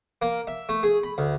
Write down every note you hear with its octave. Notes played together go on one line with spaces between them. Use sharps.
A#3
E5
A3
G#4
B5
D2